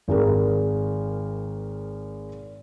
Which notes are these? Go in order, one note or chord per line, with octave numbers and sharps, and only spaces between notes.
G#1 G#4 A#4